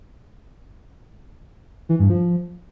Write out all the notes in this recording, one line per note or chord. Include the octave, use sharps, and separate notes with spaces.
E3
G2
F3